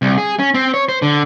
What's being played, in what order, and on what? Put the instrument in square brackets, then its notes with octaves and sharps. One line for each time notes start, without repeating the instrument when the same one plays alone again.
[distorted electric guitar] C2
G#4
C#4
C4
C#5
C5
D3